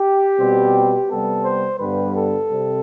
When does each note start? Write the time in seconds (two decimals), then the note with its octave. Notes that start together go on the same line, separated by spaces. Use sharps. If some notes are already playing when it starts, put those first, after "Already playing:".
Already playing: G4
0.38 B2 G3 C4
1.09 C3 G3 B3 A4
1.44 C5
1.79 G2 D3 G3 B3 B4
2.15 A4
2.50 C3 G3 C4